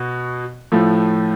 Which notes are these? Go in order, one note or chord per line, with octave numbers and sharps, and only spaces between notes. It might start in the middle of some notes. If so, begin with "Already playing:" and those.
Already playing: B2 F#4
A2 F3 A3